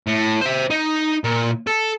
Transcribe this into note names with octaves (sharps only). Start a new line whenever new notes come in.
A2
C5 E5
D#4
A#2
A4